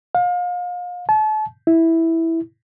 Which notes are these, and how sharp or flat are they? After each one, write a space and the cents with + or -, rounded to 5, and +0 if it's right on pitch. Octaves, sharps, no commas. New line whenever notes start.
F5 +35
A5 -35
E4 -5